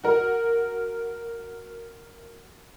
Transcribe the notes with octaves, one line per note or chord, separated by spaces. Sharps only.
F#4 A#4